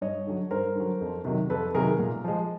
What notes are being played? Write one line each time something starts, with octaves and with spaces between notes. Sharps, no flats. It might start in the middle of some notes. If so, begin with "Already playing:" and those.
G2 C#5 D#5
D3 F#3
G2 A#4 C5
D3 F#3
F2
C3 D#3 F#3
F2 A4 B4
C3 D#3 F#3 G#4 A#4
A#2
F3 G#3